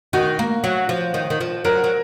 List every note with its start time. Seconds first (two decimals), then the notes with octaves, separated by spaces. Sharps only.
0.13 D#3 F#4
0.39 A#3
0.64 F#3
0.89 F3
1.14 D#3
1.30 D#3
1.41 F3
1.65 F#3 A#4
1.84 F#3